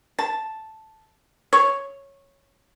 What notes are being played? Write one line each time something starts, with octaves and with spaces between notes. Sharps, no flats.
A5
C#5